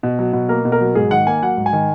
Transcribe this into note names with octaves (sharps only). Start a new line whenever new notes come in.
B2
F#3
B2
A#3 A#4
B2
A#4
F#3
G#2 G#4
D#3 F#5
A#3 G#5
F#3 F#5
G#2
G#5
D#3